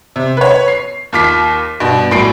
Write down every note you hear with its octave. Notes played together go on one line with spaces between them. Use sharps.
C3
B4 C#5
C7
D#2 F4 D6 B6 C7
G2 B2
A#1 A2 F#3 B5 C7 D7